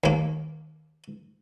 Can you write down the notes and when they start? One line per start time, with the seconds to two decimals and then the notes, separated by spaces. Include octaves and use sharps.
0.04 D#2 A#3